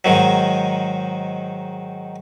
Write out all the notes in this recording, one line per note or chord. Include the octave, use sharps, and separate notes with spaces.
G#2 D#3 F#3